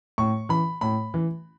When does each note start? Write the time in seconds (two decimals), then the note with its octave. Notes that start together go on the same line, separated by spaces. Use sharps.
0.18 A2 C#6
0.49 E3 B5
0.81 A2 B5
1.14 E3